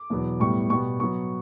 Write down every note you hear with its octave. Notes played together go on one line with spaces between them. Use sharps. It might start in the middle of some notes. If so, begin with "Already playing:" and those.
Already playing: D6
E2 B2 F#3 B3
A2 G3 B3 C#6
B2 G3 B3 C#6
B2 F#3 B3 C#6